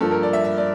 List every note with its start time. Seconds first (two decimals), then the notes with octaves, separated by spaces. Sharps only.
0.01 G2 F3 A#3 A4
0.11 A#4
0.23 D5
0.33 E5
0.44 E5
0.58 D5